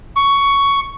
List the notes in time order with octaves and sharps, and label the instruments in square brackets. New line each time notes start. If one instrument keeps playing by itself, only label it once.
[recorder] C#6